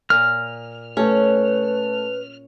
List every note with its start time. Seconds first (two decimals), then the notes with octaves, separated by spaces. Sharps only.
0.10 A#2 F6
0.97 A3 C#4 B4